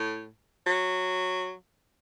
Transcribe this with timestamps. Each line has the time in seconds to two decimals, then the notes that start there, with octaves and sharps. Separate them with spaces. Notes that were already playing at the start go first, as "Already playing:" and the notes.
Already playing: A2
0.67 F#3